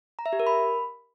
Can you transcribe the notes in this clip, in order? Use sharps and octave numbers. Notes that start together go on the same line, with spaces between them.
A#5
E5
G4
A#4
B5